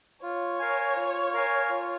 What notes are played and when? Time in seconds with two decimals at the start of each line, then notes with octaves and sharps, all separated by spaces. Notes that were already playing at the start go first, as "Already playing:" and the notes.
0.23 F4 C#5
0.60 A#4 F5 G#5
0.96 F4
1.34 A#4 F5 G#5
1.70 F4